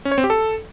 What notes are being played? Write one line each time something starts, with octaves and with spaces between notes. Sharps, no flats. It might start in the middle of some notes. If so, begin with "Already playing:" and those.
C#4
C#5
C4
G4
A4